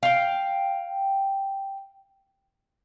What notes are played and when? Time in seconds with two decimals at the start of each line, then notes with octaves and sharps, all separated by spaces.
0.03 F5 G5